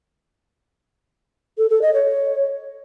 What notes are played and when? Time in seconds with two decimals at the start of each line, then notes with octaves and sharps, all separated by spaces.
1.58 A4
1.70 A4
1.82 D#5
1.94 C#5